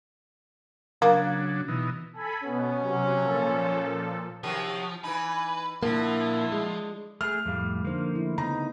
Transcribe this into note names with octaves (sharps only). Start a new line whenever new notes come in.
C#3 F#3 A#3 D4
B2 E3 D#4
A4 G#5 B5
B2 B3 C#4
C3 F#3
A#2 F3 A4
C3 D#3 F3 F#3
E3 D#4 B4 G#5
A#2 D3 F3 A#3 E4
G#3
A3 G#4 F6
F2 A2 G3 A4 F5
D3 F3 A#3 D#4 C5
A3 E4
C#3 B3 D#4 A#5